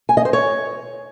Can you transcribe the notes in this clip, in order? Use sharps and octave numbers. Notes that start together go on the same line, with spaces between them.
G#5
D#5
C5
C#5